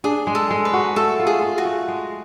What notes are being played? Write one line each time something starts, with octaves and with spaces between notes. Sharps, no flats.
D4 G#4
G#3
A4
G#3
B4
F#4
A3 A4
F4
G#4
F4
F#4
A3
G#3